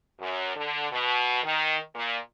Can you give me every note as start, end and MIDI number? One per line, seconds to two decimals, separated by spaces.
0.19 0.56 42
0.56 0.87 50
0.91 1.42 47
1.44 1.77 51
1.95 2.18 46